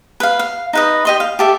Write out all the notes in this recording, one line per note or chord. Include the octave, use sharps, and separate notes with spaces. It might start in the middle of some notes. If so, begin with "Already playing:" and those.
B4 F5
F5
D#4 B4 D#5
G4 D#5 C6
F5
G4 A4 E5